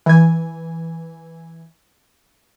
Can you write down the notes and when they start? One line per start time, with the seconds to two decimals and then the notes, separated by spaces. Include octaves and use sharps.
0.06 E3 G#5